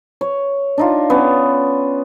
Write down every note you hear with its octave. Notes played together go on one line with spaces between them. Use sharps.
C#5
D4 D#4 F4
B3 C#4 D5